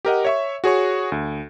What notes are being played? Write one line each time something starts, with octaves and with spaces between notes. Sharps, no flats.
G4 A#4 D#5 F#5
C#5 E5 C#6
F#4 G#4 C#5 C#6
D2